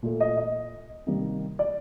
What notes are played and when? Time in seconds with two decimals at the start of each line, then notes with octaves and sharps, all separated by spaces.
0.03 A#2 A3
0.20 D#5
0.37 D#5
1.06 C3 D#3 G3 A#3
1.59 D5